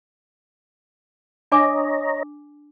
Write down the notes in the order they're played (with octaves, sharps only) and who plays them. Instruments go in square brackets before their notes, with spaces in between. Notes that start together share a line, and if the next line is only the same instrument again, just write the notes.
[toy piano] D4 G#5 D6 [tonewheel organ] C#5 D#5 A#5